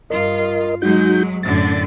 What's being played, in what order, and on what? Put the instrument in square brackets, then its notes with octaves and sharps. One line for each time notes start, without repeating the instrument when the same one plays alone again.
[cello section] G2 F4 [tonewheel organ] A#4 D#5
[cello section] F#3 G#3 [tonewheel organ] D#4 F#4 G6
[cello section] F#2 A2 D3 [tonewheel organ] A6